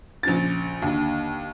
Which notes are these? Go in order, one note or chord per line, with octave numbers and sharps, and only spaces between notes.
A#1 C#3 A6
D#2 D3